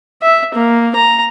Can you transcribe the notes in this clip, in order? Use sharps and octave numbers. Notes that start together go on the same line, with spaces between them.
E5
A#3
A#5